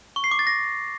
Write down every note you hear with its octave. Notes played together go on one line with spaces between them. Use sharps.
C#6
C7
D6
A6
A#6